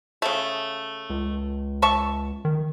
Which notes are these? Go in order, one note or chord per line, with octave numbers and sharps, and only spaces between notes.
C#3 A3
C#2
E5 A5 C#6
D#3